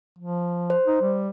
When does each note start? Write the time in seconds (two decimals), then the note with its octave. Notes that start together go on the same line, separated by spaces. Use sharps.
0.19 F3
0.70 C5
0.87 D#4
1.01 G3